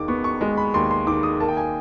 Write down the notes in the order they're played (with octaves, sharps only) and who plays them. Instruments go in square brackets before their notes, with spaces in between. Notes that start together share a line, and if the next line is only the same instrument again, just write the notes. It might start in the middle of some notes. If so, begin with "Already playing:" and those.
Already playing: [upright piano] D#2 D#3 G#3 D6
B3 C#6
C#6
G#3
B5
D#2 C6
C6
D#3 D6
D#6
A#3 A5
G5
G#5